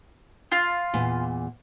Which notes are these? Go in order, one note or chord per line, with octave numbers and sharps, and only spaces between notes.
F4
E2 A#2